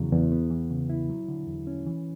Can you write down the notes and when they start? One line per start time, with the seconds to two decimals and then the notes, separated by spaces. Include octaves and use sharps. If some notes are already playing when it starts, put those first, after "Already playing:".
Already playing: E2 C#3 F#3
0.12 E2
0.32 B3
0.51 E3
0.70 C#3
0.90 E4
1.10 F#3
1.28 D3
1.48 E2
1.67 C#4
1.87 E3